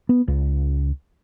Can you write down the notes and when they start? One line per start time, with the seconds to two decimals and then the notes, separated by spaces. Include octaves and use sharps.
0.09 B3
0.28 C#2